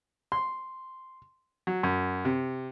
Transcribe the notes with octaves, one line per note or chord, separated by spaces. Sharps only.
C6
F#3
F#2
C3